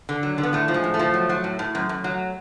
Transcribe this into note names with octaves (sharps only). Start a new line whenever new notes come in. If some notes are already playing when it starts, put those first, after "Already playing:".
D3
F#3
D3
B3
A2 A3
F3
G#3
A2
A3
F3
F#3
F#3
A2
A2
F#2
F#2
F#3